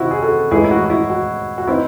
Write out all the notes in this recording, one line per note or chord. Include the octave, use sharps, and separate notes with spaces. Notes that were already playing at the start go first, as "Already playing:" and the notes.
Already playing: C3 D#3 C4 D#4 E4 F#4
G#4
F#4 A4
A2 E3 G#3 D#4 E4 G#4
E4
F#4
F#4
E4
F#4
F#4
E3 C4 D#4 E4